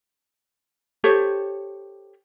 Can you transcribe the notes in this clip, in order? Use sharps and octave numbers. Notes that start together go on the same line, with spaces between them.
G4 A4 C5 C#5